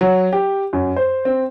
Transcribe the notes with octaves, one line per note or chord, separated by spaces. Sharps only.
F#3
G4
F#2
C5
C4